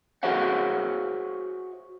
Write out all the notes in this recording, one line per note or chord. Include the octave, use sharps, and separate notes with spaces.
F#4 G#4 C5 C#5 E5 F#5